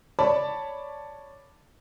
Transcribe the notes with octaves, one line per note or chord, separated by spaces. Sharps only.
C#5 D5 A5 B5